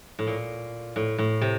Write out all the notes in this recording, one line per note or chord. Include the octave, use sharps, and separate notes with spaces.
A2
A#2
A2
A2
C3